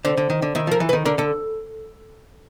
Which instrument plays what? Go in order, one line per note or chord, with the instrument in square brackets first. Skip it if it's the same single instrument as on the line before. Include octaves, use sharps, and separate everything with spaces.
[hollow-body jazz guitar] D3 [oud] C4
[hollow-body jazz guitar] D3
D#3
D3
[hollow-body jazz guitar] D#3 [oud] E4
[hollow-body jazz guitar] F3 [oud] A#4
[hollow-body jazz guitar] E3
[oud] B4
[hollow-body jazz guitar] D#3
[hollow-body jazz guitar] D3 [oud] A#4
[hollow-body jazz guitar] D3 [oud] A4